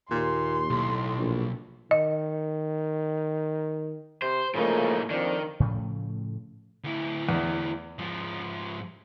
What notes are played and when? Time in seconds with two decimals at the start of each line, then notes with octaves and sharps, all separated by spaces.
0.11 D#2 A#2 C6
0.70 B1 A2
1.17 A#1
1.91 D#3 D#5
4.22 C3 C5
4.55 A2 C#3 F3 A3 A#3 D#4
5.10 F2 D#3 F3 D4
5.60 A2 C#3 F3 A3
6.84 D2 E4
7.29 E2
7.99 G#2 F3